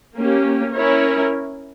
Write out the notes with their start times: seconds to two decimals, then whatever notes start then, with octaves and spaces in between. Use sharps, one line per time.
0.16 A#3 C#4 G4
0.74 C#4 E4 A#4 C#5